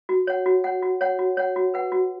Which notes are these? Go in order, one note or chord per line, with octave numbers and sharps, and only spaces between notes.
F#4
C#5 F#5
F#4
C#5 F#5
F#4
C#5 F#5
F#4
C#5 F#5
F#4
B4 F#5
F#4